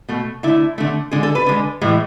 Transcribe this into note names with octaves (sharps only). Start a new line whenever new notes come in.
B2 A3
D3 A3 E4
D3 A3
D3 G#3 G#4
A4
B4
D3 G#3
A2 E3 G#3